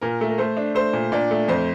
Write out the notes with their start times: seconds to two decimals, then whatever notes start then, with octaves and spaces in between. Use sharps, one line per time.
0.01 A#2 A#4
0.21 A3
0.28 A#4
0.38 A3 C5
0.57 D4
0.75 A3 C5
0.93 A#2
1.12 A#2 D4 D5
1.31 A3
1.48 F2 C5 C6